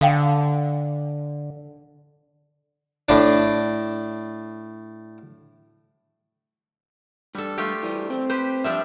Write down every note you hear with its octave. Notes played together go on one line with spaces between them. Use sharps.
D3 A4 F5 G5
A2 D4
G2 G3 A4
A3 F4 G4
E3 G3
C4
G4 B4 C5
F3 G3 D4 E5